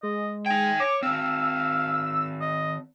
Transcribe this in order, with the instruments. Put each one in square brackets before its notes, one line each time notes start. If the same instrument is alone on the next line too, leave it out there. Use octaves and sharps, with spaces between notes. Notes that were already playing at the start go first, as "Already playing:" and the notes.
[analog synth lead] G#3 [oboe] D#5
[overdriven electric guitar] D#4 G5 [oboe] G#5
[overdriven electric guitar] C#5 [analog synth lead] D6
[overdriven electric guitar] D#3 C4 [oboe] F5 [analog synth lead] E6
[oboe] D#5